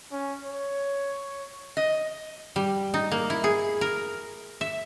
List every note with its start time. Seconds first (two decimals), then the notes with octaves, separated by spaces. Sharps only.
0.12 C#4
0.44 C#5
1.77 D#5
2.56 G3
2.94 D#4
3.11 A#3
3.30 E4
3.44 G#4
3.81 A#4
4.61 E5